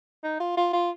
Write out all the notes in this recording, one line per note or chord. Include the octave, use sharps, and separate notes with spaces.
D#4
F4
F4
F4